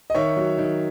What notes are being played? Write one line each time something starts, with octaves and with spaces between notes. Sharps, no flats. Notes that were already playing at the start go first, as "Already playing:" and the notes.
D#5
D#3 C#5 E5
F#3
D#3